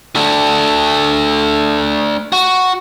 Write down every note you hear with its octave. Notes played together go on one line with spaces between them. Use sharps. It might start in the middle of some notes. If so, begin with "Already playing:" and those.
A3 D4
F#4